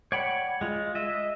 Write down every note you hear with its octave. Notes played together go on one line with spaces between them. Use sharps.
C#5 D5 F#5 G5 B5
G#3 F4
D#5 E5